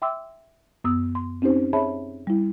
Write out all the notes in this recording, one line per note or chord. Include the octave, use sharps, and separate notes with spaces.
E5 G5 C6 D6 E6
F#2 B3 D#6 E6
C6
C4 C#4 D#4 G4 C5
G#4 C#5 E5 A5 B5
G3 E4